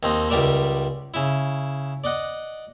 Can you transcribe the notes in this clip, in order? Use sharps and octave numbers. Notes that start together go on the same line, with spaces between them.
D#2 C4 D#4
C#2 G3 A#4 D5 E5 B5
C#3 E4
D5 D#5 F#5